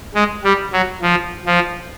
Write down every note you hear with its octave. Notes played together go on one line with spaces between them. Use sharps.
G#3
G3
F#3
F3
F3